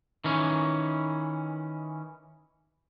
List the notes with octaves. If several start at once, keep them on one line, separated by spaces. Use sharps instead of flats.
D#3 E3 C#4